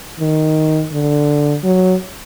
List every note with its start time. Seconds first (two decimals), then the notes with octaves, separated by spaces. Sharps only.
0.20 D#3
0.92 D3
1.64 F#3